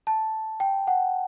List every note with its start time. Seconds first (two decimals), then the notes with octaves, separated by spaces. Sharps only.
0.07 A5
0.60 G5
0.87 F#5